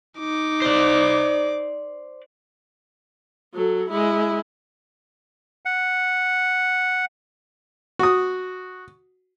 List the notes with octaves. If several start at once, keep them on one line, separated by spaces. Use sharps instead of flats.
D#4 D6
C5 D5
F#3 A4
G#3 E4
F#5
F#4 D#6